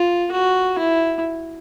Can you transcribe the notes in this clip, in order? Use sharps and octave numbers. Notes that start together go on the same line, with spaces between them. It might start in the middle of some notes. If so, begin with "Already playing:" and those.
Already playing: F4
F#4
E4